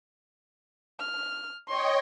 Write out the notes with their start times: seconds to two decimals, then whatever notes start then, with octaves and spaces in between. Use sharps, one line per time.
0.99 F6
1.68 C#5 D#5 G5 C6 C#6